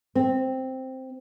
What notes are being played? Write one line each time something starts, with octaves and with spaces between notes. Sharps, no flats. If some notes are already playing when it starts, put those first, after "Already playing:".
C4